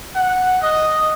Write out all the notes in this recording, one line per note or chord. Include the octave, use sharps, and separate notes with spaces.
F#5
D#5